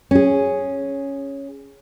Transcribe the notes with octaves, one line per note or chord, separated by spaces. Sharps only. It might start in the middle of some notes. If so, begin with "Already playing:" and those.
C#4 G#4